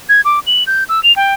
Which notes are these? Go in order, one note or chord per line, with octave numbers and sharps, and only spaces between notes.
G#6
D6
F#7
G6
E6
F7
G5